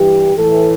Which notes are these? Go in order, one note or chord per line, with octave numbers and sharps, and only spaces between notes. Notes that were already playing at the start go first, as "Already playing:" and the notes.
Already playing: G2 E3 G4
A2 E3 A4